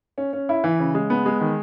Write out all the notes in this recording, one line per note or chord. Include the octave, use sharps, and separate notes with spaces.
C#4
C#4
E4
E3
C#3
G#3
B3
G#3
D#3